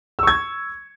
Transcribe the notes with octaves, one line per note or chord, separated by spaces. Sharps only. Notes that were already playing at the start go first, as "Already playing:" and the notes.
C#6 E6 G#6